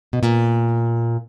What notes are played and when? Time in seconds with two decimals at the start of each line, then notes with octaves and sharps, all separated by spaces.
0.13 B2
0.23 A#2